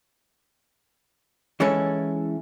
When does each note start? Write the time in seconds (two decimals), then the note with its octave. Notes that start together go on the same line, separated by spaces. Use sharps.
1.60 E3 G#3 C#4 E4 A4